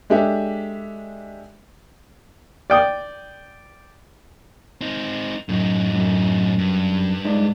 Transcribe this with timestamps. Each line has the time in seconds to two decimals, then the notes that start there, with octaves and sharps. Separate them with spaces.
0.10 G#3 D4 G4 A4 E5
2.70 D5 G5 D#6
4.81 C4 D#4
5.49 F#2 A2 D#4
5.94 F#2
6.59 G2
7.25 G#3 D#4 D5